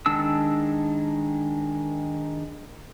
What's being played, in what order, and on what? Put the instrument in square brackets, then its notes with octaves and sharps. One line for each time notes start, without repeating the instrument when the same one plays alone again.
[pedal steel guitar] D#3 G#3 D4 A5 E6